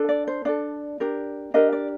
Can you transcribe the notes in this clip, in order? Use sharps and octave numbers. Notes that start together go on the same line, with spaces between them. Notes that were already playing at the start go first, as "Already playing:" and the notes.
Already playing: D4 A4
D5
C5
D4 A4 D5
D4 G4 A#4
D4 G4 A#4 D#5
D5